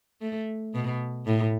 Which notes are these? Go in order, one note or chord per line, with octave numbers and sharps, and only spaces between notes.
A3
B2
A2